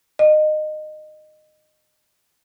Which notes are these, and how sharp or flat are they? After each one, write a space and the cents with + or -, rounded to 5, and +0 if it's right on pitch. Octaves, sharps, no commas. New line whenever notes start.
D#5 -20